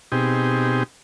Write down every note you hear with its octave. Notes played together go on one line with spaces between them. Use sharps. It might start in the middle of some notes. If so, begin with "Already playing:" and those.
B2 C4 D#4 G4 G#4